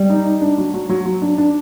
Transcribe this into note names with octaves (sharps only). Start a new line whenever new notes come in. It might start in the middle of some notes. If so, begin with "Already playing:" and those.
Already playing: G3
D#4
D#4
D4
F#3
F#3
F#3
F#3
D4
D4